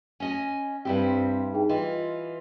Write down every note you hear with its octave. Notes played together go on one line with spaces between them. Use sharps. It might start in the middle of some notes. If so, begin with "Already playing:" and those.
C#4 D#5 G#5
G2 C4 E4 G4 G5
D#4 G#4 G5
E3 F4 D#5